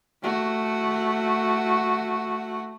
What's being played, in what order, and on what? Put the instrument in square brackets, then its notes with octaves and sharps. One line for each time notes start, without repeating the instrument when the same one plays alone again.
[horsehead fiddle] A3 F#4